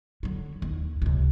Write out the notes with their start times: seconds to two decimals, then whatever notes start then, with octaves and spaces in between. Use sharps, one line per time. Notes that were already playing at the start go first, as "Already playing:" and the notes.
0.23 D3 F#3
0.62 D#2
1.02 C#2 C3